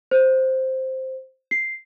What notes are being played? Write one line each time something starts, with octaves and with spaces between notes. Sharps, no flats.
C5
C7